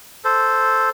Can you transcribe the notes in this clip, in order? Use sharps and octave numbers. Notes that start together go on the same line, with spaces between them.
A4 C5